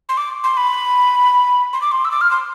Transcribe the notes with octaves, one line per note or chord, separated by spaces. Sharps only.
C6
D6
C6
B5
C6
D6
C6
E6
D6
F6
C6